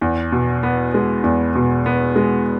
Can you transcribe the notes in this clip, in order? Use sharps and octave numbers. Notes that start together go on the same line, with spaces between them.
E2
B2
B3
G#3
E2
B2
B3
G#3